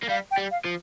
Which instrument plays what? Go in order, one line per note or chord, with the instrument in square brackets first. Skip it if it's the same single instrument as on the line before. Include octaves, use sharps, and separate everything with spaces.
[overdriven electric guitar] A#3
[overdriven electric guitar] G3 [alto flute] F5
[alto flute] G5
[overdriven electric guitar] G3
[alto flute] F5
[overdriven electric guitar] F3